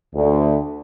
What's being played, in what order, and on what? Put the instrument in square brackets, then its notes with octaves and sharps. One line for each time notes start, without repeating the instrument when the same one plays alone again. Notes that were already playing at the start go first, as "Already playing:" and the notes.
[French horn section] D2